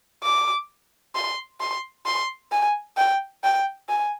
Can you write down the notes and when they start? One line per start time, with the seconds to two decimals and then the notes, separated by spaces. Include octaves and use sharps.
0.23 D6
1.15 C6
1.61 C6
2.06 C6
2.52 G#5
2.97 G5
3.44 G5
3.89 G#5